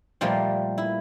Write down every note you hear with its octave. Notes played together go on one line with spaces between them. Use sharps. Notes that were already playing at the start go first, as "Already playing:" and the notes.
A#2 F3 G3 A3 A#3
E4